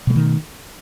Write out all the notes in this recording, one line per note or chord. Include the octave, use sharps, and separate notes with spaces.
B2 D#3 G#3 A3